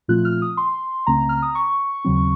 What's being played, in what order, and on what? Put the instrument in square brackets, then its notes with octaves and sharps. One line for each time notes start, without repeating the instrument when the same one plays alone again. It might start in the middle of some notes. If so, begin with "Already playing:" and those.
[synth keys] A#2 F3 A3 C4 F4 F#6
F6
D#6
C6
C#2 C#3 A3 C4 A#5
F6
D#6
C#6
D#2 C#3 F#3 C4